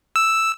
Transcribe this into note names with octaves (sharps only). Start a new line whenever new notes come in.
E6